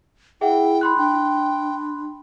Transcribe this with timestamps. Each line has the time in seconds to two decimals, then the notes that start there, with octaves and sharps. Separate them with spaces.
0.41 E4 G#4 E5 F#5 G5
0.81 B5 C6 F#6
0.98 D4 G5